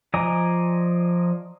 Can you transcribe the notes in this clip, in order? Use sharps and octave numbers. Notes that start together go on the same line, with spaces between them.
F3 D5 D#5 G#5 A#5